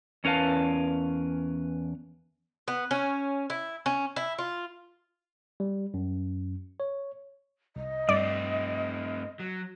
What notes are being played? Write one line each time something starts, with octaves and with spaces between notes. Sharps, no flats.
E2 C#4 A#4 B4 F5 A5
B3
C#4
E4
C#4
E4
F4
G3
F#2
C#5
C2 D#5
G2 A3 C4 D5
F#3